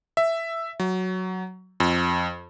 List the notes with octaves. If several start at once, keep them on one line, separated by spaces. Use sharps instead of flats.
E5
F#3
F2